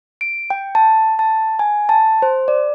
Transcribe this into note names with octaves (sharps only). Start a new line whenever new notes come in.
D7
G5
A5
A5
G#5
A5
C5
D5